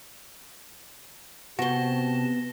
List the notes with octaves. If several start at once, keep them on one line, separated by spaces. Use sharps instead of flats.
C3 B3 C4 F#4 F#5 A5 A#6 G7